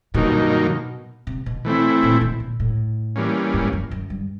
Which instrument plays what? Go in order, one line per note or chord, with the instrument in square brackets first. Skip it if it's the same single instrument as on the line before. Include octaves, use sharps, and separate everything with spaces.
[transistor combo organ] G2 D#3 F#3 A#3 D#4 [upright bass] B2
[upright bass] C3
B2
[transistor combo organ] E3 A3 C4 E4
[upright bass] A#2
B2
A#2
A2
[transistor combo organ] E3 G3 A#3 C#4
[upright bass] G#2
F#2
F#2
G2